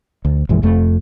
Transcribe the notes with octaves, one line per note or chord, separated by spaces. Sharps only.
D2
A#1 F#2 E3 G#3
F1 F2 A3